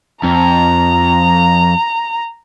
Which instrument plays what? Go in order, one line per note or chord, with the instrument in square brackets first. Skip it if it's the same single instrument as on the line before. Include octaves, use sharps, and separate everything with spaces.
[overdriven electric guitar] F2 [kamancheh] A#5